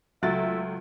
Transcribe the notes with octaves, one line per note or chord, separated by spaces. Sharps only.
C#2 F#3 A3 E5 A6